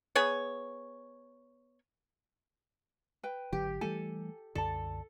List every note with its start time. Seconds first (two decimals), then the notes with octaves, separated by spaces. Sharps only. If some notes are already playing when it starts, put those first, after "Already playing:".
0.15 B3 G#4 C#5
3.23 B4 G5
3.53 G#1 D3 F#3 G4
3.81 E3 G3 A3 A4 G#5
4.55 C2 F#2 D3 A4 D5 A5